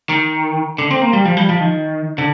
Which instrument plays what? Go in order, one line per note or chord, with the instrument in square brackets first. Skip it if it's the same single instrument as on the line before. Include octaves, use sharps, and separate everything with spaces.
[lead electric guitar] D#3
D3
C4
A#3
G3
F3
G3
F3
D#3
D3